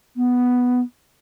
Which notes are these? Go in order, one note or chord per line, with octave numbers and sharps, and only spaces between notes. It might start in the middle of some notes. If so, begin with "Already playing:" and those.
B3